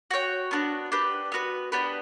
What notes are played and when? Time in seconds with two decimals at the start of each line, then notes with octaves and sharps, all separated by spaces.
0.11 F#4 C#5 G5
0.51 B3 D4 F#4
0.92 D4 G4 B4
1.32 B3 F#4 B4
1.72 B3 D4 G4 B4